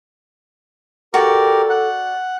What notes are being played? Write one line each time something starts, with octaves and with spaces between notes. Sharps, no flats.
F#4 G4 A4 A#4 D5
F#5